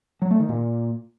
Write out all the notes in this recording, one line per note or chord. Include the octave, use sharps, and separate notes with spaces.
F#3
A3
D#3
A#2